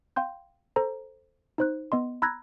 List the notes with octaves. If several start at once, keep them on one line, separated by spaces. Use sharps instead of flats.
F5 G5 C6 G6
A4 C5 A#5
D#4 C5 F#6
B3 D#5 C6
A#5 B5 E6 F#6 G#6 A#6